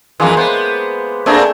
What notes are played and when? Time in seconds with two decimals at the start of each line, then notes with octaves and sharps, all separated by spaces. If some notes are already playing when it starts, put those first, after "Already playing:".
0.20 F2 E3 G#3 A#3 C6
0.37 B3 C5
1.26 A3 A#3 C4 D4 G#4